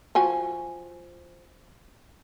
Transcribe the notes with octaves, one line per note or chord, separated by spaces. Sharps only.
F3 F#4 G#5